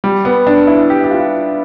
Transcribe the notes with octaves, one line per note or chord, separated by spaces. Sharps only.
G3
B3
D4
E4
G4
G4
F4